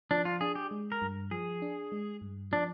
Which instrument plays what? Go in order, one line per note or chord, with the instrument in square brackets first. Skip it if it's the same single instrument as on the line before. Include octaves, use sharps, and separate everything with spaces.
[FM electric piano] F3 [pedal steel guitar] D4
[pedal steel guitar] F4
[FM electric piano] D4 [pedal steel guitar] G#4
[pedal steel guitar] G4
[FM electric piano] G#3
[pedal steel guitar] A#4
[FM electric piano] G2
[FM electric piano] F3 [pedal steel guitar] G#4
[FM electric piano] D4
G#3
G2
[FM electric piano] F3 [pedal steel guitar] D4